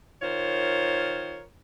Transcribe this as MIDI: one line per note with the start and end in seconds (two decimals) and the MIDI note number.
0.22 1.42 51
0.22 1.42 65
0.22 1.42 70
0.22 1.42 72
0.22 1.42 73